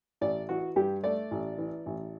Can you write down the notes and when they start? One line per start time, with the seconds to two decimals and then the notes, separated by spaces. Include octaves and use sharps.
0.21 A1 D5
0.49 E3 F#4
0.76 G2 G4
1.03 A3 D5
1.31 A1
1.58 E3
1.86 A1